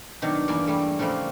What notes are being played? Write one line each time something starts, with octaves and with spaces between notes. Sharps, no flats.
B2 D#3 F#3 D4
E2 G2 A#3 D5 G#5
G3 A3
C#3 F3 G3 A3 A#3